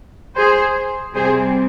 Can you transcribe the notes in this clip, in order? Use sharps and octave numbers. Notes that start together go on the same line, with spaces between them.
G#4 C5
C3 G3 C4 G#4 C5